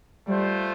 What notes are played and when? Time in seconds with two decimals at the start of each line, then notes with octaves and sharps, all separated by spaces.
0.27 G3 A3 F4 C5